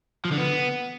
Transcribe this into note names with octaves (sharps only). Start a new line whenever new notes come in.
F3
D3
B3